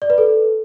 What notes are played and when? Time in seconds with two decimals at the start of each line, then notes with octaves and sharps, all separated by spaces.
0.02 D5
0.10 B4
0.18 A4